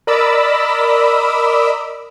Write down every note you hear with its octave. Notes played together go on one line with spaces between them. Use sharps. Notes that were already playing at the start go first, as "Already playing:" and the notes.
A#4 D5 D#5 B5 D6 E6